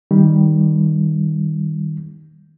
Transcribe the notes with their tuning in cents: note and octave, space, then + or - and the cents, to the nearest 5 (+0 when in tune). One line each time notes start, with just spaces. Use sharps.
D#3 +5 G3 +0